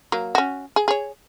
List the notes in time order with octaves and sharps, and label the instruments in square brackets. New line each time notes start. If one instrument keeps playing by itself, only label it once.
[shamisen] F#3 A#3
C#4 F#4
G#4
G#4 C#5